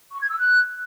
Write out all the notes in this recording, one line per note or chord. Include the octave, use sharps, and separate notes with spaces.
C#6
G#6
E6
F#6